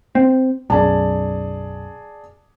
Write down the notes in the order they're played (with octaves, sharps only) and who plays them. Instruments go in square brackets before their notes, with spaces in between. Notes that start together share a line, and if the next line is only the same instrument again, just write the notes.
[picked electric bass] C4
[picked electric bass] B1 F#2 [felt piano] G#4 D5 A5